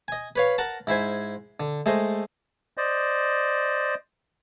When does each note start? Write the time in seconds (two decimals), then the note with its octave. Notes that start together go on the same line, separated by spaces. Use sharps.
0.08 D#5 G#5
0.36 B4 C#5 F5
0.58 A#4 F#5 A5
0.87 G#2 E4 C5 G#5
1.60 D3
1.86 G#3 A3 C5 D#5
2.77 C5 D5 D#5